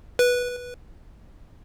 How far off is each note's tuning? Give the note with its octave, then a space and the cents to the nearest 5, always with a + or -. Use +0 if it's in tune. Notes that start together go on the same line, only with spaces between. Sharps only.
B4 -10